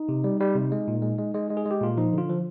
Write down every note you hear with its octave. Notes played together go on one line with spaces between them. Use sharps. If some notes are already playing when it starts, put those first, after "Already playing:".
Already playing: D#4
C3
G3
G3
C3
G#3
A#2
G#3
G#3
G#3
G#3
G#4
G#3
G4
A#2 F4
F3 D#4
D3 F4
F3